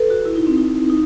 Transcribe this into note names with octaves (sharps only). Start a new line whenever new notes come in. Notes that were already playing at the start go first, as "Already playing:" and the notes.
Already playing: A4 B4
F#4
E4
D#4
C4
D#4
D#4